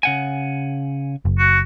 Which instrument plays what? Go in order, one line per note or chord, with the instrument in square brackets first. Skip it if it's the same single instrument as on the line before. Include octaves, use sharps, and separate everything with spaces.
[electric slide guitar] C#3 F#5 G#5
[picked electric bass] F#1
[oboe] F#4